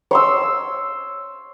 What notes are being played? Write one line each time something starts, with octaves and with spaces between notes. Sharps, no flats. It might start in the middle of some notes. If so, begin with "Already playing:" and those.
C#5 C6 E6